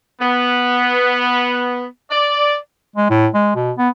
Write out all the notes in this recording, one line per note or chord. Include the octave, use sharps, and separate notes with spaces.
B3
D5
G#3
A2
G#3
B2
B3